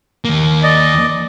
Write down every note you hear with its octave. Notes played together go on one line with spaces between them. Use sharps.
D#2 A#3
D5 D#5